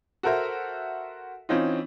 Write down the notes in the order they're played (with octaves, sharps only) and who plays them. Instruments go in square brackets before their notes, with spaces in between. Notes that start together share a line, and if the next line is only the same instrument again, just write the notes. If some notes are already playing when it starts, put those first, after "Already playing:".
[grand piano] F#4 A4 A#4 C5 E5
E3 C4 C#4 D#4 F4